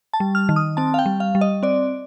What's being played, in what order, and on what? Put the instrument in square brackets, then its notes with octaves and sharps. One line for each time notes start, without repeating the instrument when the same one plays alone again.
[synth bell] A5
G3
F6
D#3
D#6
C4 A5
F5
G5
G3
F5
G3
D#5
C4 D5